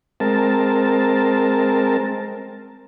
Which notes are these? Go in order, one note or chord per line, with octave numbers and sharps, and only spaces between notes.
G#3 C4 A#4 A5